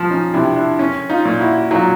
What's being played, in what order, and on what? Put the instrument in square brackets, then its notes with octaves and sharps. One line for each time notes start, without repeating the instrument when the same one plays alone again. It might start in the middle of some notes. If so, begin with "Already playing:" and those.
Already playing: [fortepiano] F3
[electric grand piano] C#4 D#4
[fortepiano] C3 [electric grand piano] D4 E4
[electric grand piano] D4 E4
[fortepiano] C#4
[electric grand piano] D#4 F4
[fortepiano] A#2
[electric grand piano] E4 F#4
[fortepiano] F#3 [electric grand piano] D#4 F4